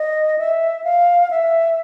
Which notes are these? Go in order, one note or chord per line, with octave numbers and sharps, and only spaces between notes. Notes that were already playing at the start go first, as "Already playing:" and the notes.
Already playing: D#5
E5
F5
E5